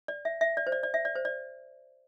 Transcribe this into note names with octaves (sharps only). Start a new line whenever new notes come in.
D5
E5
E5
D5
C5
D5
D5
E5
D5
C5
D5